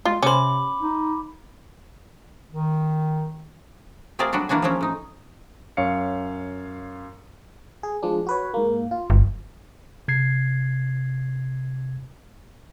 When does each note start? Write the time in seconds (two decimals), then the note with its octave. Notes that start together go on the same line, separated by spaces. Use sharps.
0.05 G#3 F4
0.23 C3 C#4 C5 B5 D6
0.81 D#4
2.53 D#3
4.19 A3 C4 F4 G#4 A#4 D5
4.33 F#3 G3 D4 F#4
4.49 E3 A#3 D4 F#4 G#5
4.62 F3 G#3 A#3 C4 C#4
4.81 A2 D#4
5.77 F#2 C#5 F5 C#7
7.83 G#4
8.03 F3 G#3 D4
8.27 F#4 B4 C#5
8.54 G#2 A#3
8.91 F4
9.10 G1
10.08 C3 G#6 C7